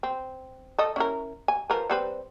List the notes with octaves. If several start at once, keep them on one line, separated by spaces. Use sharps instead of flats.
C4
A4 D#5
C#4 E4 A#4
G#5
F3 A#4 B4
G3 C4 B4